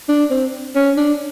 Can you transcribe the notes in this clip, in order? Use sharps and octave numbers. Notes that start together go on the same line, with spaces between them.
D4
C4
C#4
D4